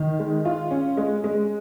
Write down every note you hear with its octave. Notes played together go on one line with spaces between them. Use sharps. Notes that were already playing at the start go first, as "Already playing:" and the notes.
Already playing: D#3
G#3
F4
C#4
G#3
G#3